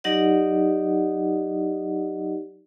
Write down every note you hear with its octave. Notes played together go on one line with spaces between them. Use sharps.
F#3 D#4 G4 D5 D#5 F#5